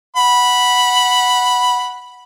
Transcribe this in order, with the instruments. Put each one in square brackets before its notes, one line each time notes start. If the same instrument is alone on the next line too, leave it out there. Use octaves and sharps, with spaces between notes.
[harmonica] F#5 B5